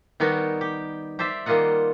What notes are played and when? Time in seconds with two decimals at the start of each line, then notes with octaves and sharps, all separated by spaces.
0.20 D#3 G3 B3 D#4 F#4 A#4
0.61 G4
1.19 G4 C5 D5 E5
1.46 D#3 G3 A#3 F4 D#5 F#5